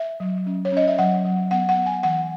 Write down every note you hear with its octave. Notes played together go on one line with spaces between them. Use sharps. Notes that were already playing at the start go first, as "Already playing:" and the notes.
Already playing: E5
F#3
C#4
C#5
C#4 D#5
E5
F#3 F#5
F#3
B3 F#5
F#5
B3
G#5
E3 F#5